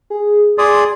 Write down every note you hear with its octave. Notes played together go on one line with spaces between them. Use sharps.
G#4
G#4 D5 C6 D#6